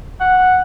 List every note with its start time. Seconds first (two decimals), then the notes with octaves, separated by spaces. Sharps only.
0.20 F#5